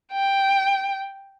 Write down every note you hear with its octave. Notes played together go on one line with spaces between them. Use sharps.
G5